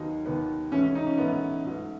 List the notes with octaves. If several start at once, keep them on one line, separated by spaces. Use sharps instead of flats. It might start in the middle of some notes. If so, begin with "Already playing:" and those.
Already playing: D#2 D#3 F#3 B3 D#4
D#2 D#3 F#3 B3
G#2 E3 A3 C#4
C#4
D#4
C#4
G#2 E3 A3 B3
G#2 F#3 A3